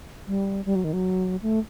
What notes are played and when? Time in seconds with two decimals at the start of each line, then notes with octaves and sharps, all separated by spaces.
0.27 G3
0.65 G3
0.75 F#3
0.84 D#3
0.93 F#3
1.42 A3